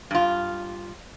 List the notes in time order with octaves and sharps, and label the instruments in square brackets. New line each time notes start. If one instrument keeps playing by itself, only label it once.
[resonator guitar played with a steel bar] G2 F4